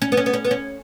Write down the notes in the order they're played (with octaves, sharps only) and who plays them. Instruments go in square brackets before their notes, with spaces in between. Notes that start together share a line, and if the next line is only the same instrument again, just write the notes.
[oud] C#4
B3
C#4
B3
C#4
B3
C#4